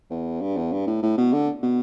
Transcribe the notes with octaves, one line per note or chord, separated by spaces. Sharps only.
E2
G2
E2
G2
A2
A2
B2
D3
B2